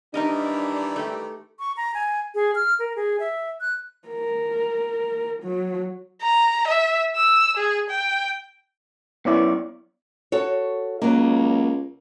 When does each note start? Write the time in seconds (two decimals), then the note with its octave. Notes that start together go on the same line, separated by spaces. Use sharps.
0.14 D#3 E3 G3 D4 D#4 A#4 D#5
0.96 A3 G4
1.59 C#6
1.77 A#5
1.94 G#5
2.35 G#4
2.55 F6
2.79 A#4
2.96 G#4
3.20 E5
3.61 F#6
4.09 A#4
5.43 F#3
6.22 A#5
6.68 E5
7.16 E6
7.57 G#4
7.90 G5
9.25 F#2 B3 E4 C#5 D5
10.32 F#4 A4 C#5
11.02 C#2 F#3 A#3